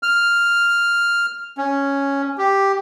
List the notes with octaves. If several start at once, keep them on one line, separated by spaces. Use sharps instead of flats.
F6
C#4
G4